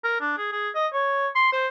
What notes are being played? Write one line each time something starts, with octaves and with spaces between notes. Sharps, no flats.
A#4
D4
G#4
G#4
D#5
C#5
C6
C5